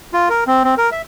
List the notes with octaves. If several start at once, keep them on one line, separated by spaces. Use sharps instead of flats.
F4
A#4
C4
C4
A#4
E5